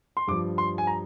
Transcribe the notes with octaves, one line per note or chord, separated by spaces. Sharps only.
C6
G2 F3 D6
C6
G#5
A#5